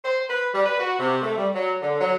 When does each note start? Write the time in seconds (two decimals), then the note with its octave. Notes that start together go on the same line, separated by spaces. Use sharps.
0.05 C5
0.29 B4
0.53 G3
0.65 B4
0.79 F#4
0.99 C3
1.21 A3
1.36 G3
1.54 F#3
1.81 D3
2.00 F#3